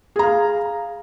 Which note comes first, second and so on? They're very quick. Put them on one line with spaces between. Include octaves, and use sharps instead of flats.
G#4 A#5 F5